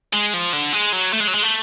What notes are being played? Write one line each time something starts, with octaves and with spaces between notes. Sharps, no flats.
G#3
F3
D3
G#3
F#3
A3
G#3
F#3
G#3
A3